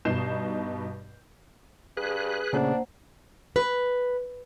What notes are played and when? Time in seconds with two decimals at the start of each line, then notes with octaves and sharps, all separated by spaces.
0.05 G2 B2 D#4 G6 C7 E7
1.97 G2 G#4 B4 F#6
2.53 A#2 C#3 A3 A#3 D4 C5 F#5
3.56 B4